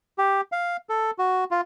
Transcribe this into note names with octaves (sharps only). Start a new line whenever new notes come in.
G4
F5
A4
F#4
F4